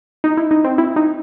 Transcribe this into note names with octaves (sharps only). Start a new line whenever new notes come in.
D#4
E4
D#4
C4
E4
D#4